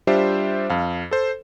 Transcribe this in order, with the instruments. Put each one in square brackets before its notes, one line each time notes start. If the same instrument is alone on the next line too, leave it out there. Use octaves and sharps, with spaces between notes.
[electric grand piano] G3 D4 F4 G4 C5 E5
F2 F5
A4 C5